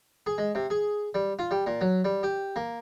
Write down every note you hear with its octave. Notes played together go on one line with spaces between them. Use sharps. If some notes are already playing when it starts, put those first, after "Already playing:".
G#4
G#3
C3
G#4
G3
F4
G3
A#2
F#3
G3
G4
A#3